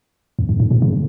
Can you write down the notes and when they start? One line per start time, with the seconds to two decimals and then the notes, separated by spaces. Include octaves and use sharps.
0.39 F2
0.49 G2
0.60 G#2
0.71 A#2
0.82 C#3